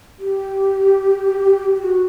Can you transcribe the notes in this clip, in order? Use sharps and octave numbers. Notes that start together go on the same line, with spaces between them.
G4
G4
F#4